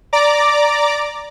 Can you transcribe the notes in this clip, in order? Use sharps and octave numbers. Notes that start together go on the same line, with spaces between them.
D5 A#5 D6